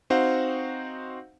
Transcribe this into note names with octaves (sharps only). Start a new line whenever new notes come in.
C4 D#4 F#4 C5 F5 F#5